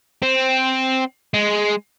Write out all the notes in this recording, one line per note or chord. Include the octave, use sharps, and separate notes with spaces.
C4
G#3